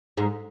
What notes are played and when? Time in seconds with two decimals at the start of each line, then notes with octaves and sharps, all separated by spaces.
0.17 G#2